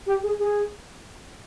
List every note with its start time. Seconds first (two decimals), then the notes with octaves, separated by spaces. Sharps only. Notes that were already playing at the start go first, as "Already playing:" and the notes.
0.06 G4
0.23 G#4
0.39 G#4